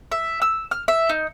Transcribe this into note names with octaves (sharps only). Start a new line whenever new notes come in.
E5
E6
F6
E5
D#4